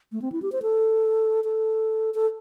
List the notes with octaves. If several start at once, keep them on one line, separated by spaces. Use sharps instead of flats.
A3
C4
E4
G4
C5
A4
A4
A4